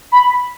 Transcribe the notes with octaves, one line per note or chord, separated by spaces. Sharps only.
B5